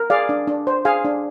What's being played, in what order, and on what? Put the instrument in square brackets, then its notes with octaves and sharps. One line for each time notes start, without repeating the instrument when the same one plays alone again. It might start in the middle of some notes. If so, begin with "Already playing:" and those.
Already playing: [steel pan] A#4
G#4 D5 F5
D4
D4
C5
G#4 F5 G#5
D4